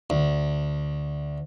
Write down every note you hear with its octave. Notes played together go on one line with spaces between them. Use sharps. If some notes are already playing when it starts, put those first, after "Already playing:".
D2